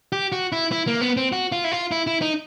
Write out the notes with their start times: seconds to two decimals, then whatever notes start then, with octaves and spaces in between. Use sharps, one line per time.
0.12 G4
0.32 F#4
0.52 E4
0.72 E4
0.87 A#3
1.01 B3
1.17 C4
1.32 F#4
1.52 F4
1.64 E4
1.72 F4
1.91 E4
2.07 E4
2.22 D#4